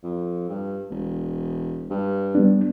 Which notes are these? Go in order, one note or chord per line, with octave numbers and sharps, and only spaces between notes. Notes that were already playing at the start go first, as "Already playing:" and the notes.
F2
G2
E1
G2
G3 B3 D4